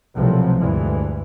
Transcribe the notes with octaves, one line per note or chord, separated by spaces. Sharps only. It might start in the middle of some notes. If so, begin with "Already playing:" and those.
C2 B2 F3 F#3 A3 C4
D2 G2 E3 G#3